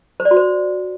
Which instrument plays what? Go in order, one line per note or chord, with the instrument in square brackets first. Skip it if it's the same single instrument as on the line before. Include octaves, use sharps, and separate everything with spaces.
[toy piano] C5
D5
F#4
C5